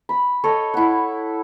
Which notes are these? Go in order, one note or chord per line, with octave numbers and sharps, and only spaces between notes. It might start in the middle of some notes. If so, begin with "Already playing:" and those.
B5
A4 C#5 D#5
E4 F#5